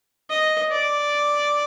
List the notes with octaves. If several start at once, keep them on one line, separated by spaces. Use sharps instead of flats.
D#5
D5